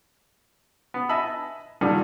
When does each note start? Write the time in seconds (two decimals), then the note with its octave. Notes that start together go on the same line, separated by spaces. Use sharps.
0.94 B3
1.09 D#5 E5 G#5 A5 B5 E6
1.81 G2 A#2 D3 D#3 G3